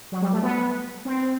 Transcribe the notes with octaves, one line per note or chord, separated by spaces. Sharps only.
F#3
G3
A3
B3
C4